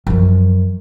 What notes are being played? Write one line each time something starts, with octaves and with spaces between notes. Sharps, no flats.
F#2 F3